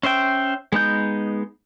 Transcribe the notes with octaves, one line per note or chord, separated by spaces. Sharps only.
C#4 C5 E5 G5
G#3 B3 D#4 G6